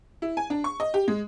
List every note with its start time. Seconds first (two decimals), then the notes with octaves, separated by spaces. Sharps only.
0.22 E4
0.37 G#5
0.50 D4
0.64 C#6
0.80 D#5
0.94 G4
1.08 G#3